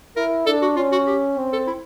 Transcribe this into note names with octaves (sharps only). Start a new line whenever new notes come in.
E4 A#4
D4 A4
F#4
C#4 F4
F#4
G4
C4
A4
E4